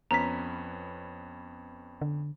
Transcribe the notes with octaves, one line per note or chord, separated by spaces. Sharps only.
F2 B3 C#4 A#5 B6
D3